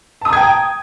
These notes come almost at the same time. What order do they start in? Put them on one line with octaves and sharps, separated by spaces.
A5 D#6 A#5 G#6 G5